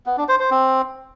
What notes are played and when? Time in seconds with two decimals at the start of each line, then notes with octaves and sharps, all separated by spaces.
0.06 B3
0.17 D4
0.28 C5
0.40 C5
0.51 C4